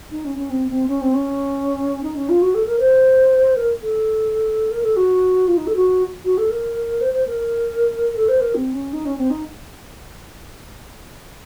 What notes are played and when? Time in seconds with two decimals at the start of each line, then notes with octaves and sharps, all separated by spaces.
0.11 D#4
0.25 C#4
0.37 C#4
0.50 C4
0.69 C4
0.87 C#4
1.01 C4
1.14 C#4
2.03 D#4
2.15 C#4
2.29 F4
2.42 F#4
2.54 A4
2.66 A#4
2.80 C5
3.56 A#4
3.82 A4
4.71 A#4
4.83 A4
4.96 F#4
5.48 F4
5.57 D#4
5.67 A4
5.76 F#4
6.25 F#4
6.38 A4
6.50 A#4
7.01 C5
7.13 C5
7.27 A#4
8.16 A4
8.28 C5
8.41 A#4
8.55 C4
8.73 C#4
8.93 D#4
9.05 C#4
9.17 C4
9.30 D#4